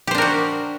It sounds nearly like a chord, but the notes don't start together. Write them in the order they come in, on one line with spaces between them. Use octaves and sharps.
G4 C5 D4 A#4 F#4